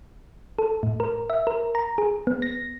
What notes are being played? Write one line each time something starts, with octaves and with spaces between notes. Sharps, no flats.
A4
A2
A#4
E5
A#4
A#5
G#4
B3
A#6